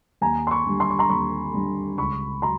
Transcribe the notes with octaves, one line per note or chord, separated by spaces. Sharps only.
D#2 G#5 A#5
C6
B5 C#6
D3 G3
C6
C#6
A#5 C6
D#2 B5 C#6
D3 G3
C#2 B5 C#6
F#3 A#5 C6